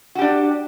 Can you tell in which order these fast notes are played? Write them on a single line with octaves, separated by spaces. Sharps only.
F#4 G4 D4